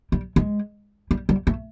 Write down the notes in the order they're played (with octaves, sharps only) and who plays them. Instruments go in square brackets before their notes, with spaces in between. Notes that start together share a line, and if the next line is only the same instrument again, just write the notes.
[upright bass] G3
G#3
G3
G3
A3